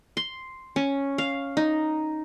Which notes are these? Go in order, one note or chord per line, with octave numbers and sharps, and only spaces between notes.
C6
C#4
F5
D#4